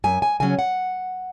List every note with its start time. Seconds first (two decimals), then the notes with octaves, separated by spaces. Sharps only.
0.04 F#2 G#5
0.22 G#5
0.40 C#3 F#3 C#4 G#5
0.59 F#5